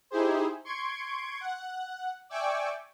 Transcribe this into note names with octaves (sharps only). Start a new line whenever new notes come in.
D#4 E4 G4 G#4 C5
C6 C#6 G#6 D7
F#5
D5 E5 G5 G#5 C#6 D6